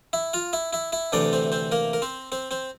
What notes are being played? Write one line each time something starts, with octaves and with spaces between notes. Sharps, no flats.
E4 E5
F4 F5
E4 E5
E4 E5
E4 E5
D2 C3 E3 A3 D4 D5
C4 C5
C4 C5
A#3 A#4
A#4
C4 C5
C4 C5
C4 C5